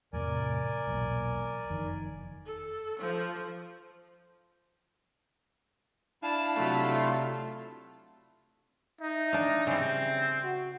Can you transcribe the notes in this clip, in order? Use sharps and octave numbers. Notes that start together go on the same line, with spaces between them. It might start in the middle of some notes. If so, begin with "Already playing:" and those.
E2 A2 C3 A#4 D5 G#5
B1 E2 A#2
F#1 F2 D#3
A4
F3
D4 E4 F5 A5
C3 F#3 A3 F4
D#4 E5
D4 F5
C#3 G3 C4
F#4